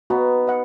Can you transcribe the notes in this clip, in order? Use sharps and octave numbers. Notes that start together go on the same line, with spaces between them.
B3 D#4 F#4
D#5 F#5